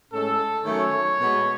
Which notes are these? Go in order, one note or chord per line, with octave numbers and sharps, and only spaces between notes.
A2 G#3 C#4 A4
D#3 F#3 A3 C#4 C#5
B2 G#3 B3